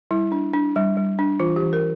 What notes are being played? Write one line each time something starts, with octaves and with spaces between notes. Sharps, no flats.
G3 E4
D4
D4
G3
G3
D4
E3 F4
G4
E3
A#4